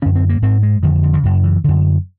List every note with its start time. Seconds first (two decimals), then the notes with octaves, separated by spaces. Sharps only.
0.02 F#2 D3 C#4
0.15 C4
0.29 A#3
0.42 G#2 C4
0.63 G#3
0.83 F2 D3 D#3
1.03 D3
1.13 D3
1.23 F#2 C#3
1.43 E3
1.64 F#2 D3